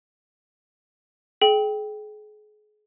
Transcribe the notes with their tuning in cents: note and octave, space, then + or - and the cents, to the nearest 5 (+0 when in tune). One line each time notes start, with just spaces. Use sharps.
G#4 +35 G5 +0